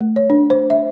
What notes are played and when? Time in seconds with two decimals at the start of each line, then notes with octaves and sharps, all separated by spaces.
0.01 A3
0.16 C#5
0.30 D4
0.50 C5
0.70 E5